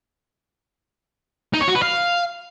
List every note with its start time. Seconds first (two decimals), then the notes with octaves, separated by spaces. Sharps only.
1.54 D#4
1.61 C#5
1.68 F#4
1.75 B4
1.82 F5